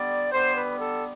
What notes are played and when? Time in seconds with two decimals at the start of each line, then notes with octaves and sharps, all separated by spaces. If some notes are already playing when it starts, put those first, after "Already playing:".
Already playing: D3 G3 B3 D5
0.32 D3 G3 B3 C5
0.55 B4
0.79 A4